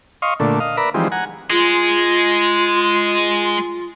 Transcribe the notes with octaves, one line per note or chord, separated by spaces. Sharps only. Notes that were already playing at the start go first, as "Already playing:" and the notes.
D#5 F5 C6 C#6
A#2 D3 A3
D#5 F5
A#4 B4 D5 E5 A#5 B5
E3 F3 G3 G#3 C4 D#4
F#5 G#5 A#5
G#3 F4